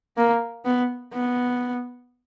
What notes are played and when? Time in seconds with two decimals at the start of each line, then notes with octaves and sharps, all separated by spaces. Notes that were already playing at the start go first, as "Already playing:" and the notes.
0.17 A#3
0.65 B3
1.14 B3